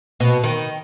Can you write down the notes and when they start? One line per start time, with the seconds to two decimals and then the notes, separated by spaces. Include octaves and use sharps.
0.20 B2
0.44 D#3